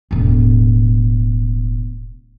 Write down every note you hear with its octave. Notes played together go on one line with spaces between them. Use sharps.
E1 A2